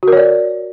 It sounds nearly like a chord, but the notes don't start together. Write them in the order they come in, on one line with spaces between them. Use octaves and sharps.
F#4 A#4 C#5 D5